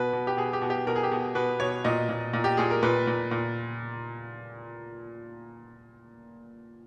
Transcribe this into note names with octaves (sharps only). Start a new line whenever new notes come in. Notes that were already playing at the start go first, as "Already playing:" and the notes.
Already playing: B2 B4
B2
G4
B2 G#4
G4
B2
G4
B2 A#4
G#4
G4
B2
B2 B4
B2 C#5
A#2 D#5
A#2
A#2
G4
A#2 G#4
A#4
A#2 B4
A#2
A#2